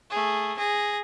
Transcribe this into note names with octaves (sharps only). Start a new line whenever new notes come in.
A3 G#4
G#4 A#6